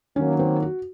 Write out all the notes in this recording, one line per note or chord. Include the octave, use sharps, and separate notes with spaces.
D#3 F#3 A#3 C#4
C4
F#4